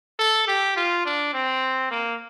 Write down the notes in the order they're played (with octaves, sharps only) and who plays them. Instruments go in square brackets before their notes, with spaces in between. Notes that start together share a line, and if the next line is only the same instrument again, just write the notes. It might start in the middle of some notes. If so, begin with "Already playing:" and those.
[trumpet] A4
G4
F4
D4
C4
A#3